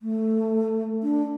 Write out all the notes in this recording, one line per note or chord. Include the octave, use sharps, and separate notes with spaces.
A3
D4